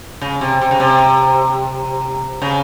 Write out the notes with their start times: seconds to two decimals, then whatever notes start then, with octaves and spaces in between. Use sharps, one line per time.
0.21 C#3
0.41 C3
0.62 C3
0.71 C#3
0.80 C3
2.42 C#3